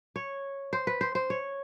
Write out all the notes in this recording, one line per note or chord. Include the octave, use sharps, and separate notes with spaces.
C#5
C5
B4
C5
C5
C#5